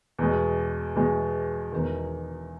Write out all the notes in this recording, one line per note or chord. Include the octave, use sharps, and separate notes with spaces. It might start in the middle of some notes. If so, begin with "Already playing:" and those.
E2 B2 G#3
E2 B2 G#3
E1 E2 D#3